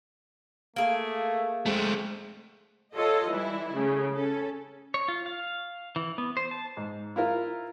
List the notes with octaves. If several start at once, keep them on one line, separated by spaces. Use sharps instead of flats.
A3 A#3 G#4
G#3 A3 C4
F4 A4 C#5 D#5
E3 G3 E4
C#3 A3
C#4 A4
C#5
F4
F5
E3
B3
C5
A5
G#2
E4 F4 A#4